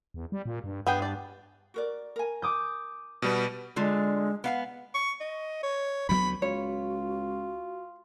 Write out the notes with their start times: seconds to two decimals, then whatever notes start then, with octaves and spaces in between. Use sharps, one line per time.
0.14 E2
0.32 G3
0.46 A#2
0.64 G2
0.87 G2 B3 G#4 G5
1.02 D5 A5
1.74 F#4 A#4 D5
2.16 A#4 G#5
2.42 D6 D#6 G6
3.22 B2 G3 B3
3.76 D3 G#3 D4 F4
4.44 B3 F5 F#5 G#5
4.95 C#6
5.20 D#5
5.63 C#5
6.09 D2 F#3 B3 B5
6.42 C#2 F4 F#4 C#5